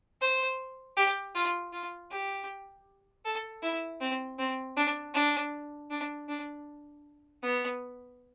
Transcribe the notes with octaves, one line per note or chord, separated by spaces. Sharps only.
C5
G4
F4
F4
G4
A4
E4
C4
C4
D4
D4
D4
D4
B3